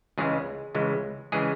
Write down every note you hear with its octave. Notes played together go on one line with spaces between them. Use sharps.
C#2 C#3 E3 G#3 G#4
C#2 C#3 E3 G#3
C#3 E3 G#3 G#4